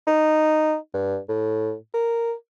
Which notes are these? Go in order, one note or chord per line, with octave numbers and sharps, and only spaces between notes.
D#4
G2
A2
A#4